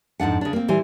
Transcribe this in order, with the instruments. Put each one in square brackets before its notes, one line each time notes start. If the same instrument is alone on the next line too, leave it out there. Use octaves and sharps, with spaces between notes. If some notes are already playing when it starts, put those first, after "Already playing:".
[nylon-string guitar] F2 G#2 C#3 D4 F#5
C#3 D4
A#3 C4
A#2 E3 G3 C5 G#5